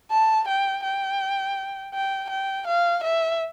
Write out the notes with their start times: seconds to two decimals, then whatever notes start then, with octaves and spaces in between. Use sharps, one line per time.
0.10 A5
0.48 G5
0.83 G5
1.94 G5
2.29 G5
2.67 F5
3.03 E5